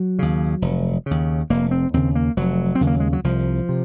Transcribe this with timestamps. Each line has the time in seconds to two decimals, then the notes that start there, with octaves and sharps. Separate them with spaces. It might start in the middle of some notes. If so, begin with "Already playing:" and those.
Already playing: F#3
0.19 D#2 C#3
0.62 F1
1.06 D#2 C#3
1.50 F1 A#3
1.71 C4
1.94 D#2 C#3 C4
2.15 A#3
2.37 F1 F#3
2.75 C4
2.81 D#2 C#3
2.87 A#3
3.00 G#3
3.13 F#3
3.24 C2 F3
3.69 C3